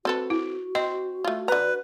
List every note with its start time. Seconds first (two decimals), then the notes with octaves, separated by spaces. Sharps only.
0.05 C4 F#4 A4 B4
0.30 E4
0.75 C4 D#5
1.24 A3 F4
1.48 D3 B4 A#5